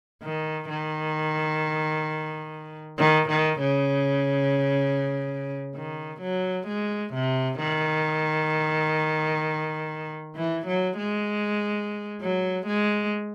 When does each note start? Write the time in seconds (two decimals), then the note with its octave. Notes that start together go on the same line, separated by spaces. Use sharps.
0.23 D#3
0.69 D#3
2.98 D#3
3.29 D#3
3.60 C#3
5.75 D#3
6.21 F#3
6.67 G#3
7.14 C3
7.59 D#3
10.36 E3
10.67 F#3
10.97 G#3
12.21 F#3
12.67 G#3